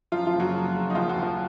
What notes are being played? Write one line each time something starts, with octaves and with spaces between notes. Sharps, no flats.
F#2 F3 F4
F3 F4
F#1
F#3 F#4
F3
F#1
D#4
D#2 F3 F4
F#3 F#4
D#2
F3 F4